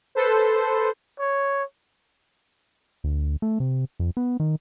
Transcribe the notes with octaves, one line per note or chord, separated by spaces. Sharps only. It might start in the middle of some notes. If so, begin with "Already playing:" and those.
A4 B4 C5
C#5
D2
A3
C3
F2
B3
D#3